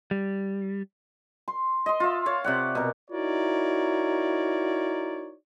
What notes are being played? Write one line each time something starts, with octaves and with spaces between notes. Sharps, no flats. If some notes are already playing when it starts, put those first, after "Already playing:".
G3
C6
D#5 C6
F4 E5
C#5 F5
C3 D5 F#5
B2 A#4
D#4 E4 F#4 A#4 C#5 D5